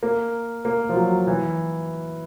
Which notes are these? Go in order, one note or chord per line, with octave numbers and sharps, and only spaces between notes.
A#3
A#3
F3
F#3
E3